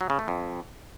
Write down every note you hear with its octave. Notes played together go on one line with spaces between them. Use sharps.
F#3
C#3
A3
F2